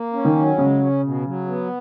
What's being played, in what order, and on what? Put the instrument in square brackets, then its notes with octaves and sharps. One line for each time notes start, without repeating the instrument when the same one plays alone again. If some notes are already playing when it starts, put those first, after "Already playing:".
Already playing: [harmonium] A#3
C#4
[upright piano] D#3
[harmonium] F#3
[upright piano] C#3 [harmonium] G#3
[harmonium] C#4
B2
F#3
B3